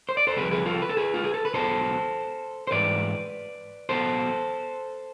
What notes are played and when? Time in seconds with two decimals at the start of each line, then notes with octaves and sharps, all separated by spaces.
0.09 C5
0.17 D5
0.27 A4 C5
0.37 C2 C3 F3 G#4 B4
0.51 G#4 B4
0.66 F4 A4
0.82 B4
0.89 A4
0.97 G#4 B4
1.14 F4
1.24 G#4
1.34 A4
1.45 B4
1.54 B1 B2 A4 C5
2.67 C5
2.71 G#2 E3 B4 D5
3.89 B1 B2 A4 C5